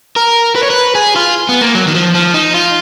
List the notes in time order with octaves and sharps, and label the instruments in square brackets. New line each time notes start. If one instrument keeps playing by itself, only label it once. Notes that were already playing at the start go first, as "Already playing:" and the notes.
[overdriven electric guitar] A#4
B4
C#5
B4
G#4
F4
B3
A#3
F#3
D#3
F3
F3
D#4
F4